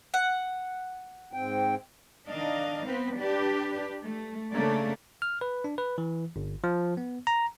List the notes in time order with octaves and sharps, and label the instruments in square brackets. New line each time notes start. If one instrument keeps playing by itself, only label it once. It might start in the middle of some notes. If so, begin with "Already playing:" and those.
[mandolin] F#5
[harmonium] G#2 C4 G5
[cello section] D#3 D4 D#5 F5
B3 C4 B4
D4 G4 B4
A3
C#3 A3 A#3 D4 D5
[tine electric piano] F6
B4
D4
B4
E3
G1
F3
B3
A#5